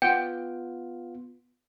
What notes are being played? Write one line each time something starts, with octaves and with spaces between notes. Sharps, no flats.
B3 F4 F#5 G5